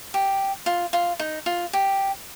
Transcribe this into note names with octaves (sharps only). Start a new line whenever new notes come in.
G4
F4
F4
D#4
F4
G4